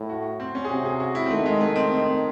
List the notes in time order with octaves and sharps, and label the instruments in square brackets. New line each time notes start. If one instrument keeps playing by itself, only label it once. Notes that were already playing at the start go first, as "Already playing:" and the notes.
Already playing: [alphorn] A2
[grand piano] F#4
C4
C#4
G#4
[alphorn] C3 [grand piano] F#4
[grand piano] G#4
F#4
E4
C4
[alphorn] D#3 [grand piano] A3
[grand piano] G#3
A3
C4